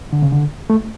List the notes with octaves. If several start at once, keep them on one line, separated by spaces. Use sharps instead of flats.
D3
C#3
D3
A3